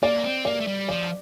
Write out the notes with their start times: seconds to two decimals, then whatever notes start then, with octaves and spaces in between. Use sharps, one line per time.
0.03 A#3 D5
0.24 C4
0.45 A#3 D5
0.60 A3
0.67 G3
0.89 F3 D5